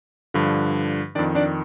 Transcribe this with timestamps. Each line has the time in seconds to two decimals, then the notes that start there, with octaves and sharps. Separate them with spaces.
0.34 G2 D3 F3
1.15 F2 D#3 D4 D5
1.35 D4 D5